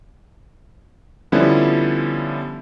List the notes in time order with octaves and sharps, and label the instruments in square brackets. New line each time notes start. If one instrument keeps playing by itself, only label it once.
[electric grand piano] D3 F3 G3 B3 C#4 E4